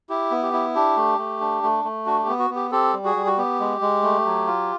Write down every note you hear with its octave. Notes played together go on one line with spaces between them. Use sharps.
E4 G4
B3
G4
E4
D4 G4
A3
A3
D4
A3
A3
D4 F#4
G4
B3
F#4
B3
G4
C4 G4 A4
G3
F#4 G#4
G3
F#4
B3 G4
G#3
G#3
A3
F#3
F4